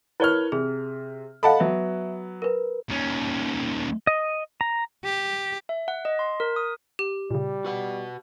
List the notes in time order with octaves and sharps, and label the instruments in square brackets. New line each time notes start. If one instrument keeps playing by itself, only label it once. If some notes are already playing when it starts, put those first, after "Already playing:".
[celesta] E4 A#4 G7 [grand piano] B4 C#5 F6
[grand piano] C3 [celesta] G#4
[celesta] A4 D#5 F5 [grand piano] F#5 A5 B5
[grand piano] F#3 B3 [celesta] E5
[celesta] A#4 B4
[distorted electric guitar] D#2 C#4
[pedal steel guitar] D#5
A#5
[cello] G4
[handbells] E5
F#5
D#5
C6
A#4
D#6
[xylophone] G4
[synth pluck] A#2 C#3 [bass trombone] G3
[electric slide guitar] F#4 B4 F#5